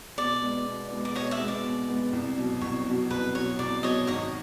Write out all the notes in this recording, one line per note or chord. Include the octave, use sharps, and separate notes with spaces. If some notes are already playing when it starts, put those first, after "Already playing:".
B2 D5
G#3 B3
B2
G#3 B3
D5
B2 C#5 D#5
D5 E5
G#3 B3
D5
B2
G#3 B3
C2
B2 F#3
C2 C#5
B2 F#3
C2 B4
B2 F#3 C#5
C2 D5
B2 F#3 C#5 D#5
G#1 C#5 D#5